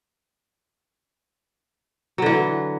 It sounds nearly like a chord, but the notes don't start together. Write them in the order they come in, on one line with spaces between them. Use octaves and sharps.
F#3 D3 E3